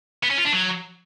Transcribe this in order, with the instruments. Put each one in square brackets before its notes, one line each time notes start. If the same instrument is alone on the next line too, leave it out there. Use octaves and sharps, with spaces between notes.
[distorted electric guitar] B3
C#4
F4
D4
F#3